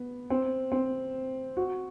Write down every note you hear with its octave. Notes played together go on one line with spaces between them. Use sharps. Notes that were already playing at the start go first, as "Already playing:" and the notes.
Already playing: B3
C4
C4
F#4